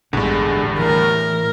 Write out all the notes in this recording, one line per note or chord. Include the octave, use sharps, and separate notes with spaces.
A1 E2 G2 D3 G#3
A2 E3 A#4